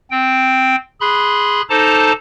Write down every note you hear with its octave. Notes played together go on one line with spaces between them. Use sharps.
C4 G5
G#4 B5 C6 F#6
D#4 A4 C5 A5 A#5 D6